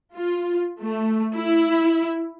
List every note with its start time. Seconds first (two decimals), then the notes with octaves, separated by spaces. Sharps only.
0.16 F4
0.80 A3
1.35 E4